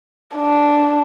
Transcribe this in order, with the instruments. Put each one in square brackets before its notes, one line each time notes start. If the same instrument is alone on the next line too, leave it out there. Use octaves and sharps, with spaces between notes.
[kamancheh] D4